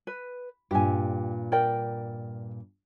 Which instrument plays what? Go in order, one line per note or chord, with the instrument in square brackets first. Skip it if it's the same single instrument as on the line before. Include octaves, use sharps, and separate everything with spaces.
[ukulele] B4
[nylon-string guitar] G2 A#2 [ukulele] G4 G#5
[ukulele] A#4 D5 G5